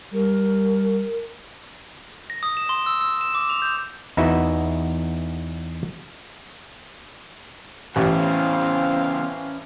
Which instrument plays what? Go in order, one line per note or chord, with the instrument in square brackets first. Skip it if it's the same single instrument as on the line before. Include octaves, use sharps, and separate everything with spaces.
[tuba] G3 [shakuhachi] A#4
[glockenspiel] A#6
D#6
E7
C6
E6
E6
E7
D6
F7
G6
[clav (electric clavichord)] E2 D#4 E4 F#4 B4 E5
[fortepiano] A1 [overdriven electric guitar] E2 C#3 [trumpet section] C4 C5 F5 [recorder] C#4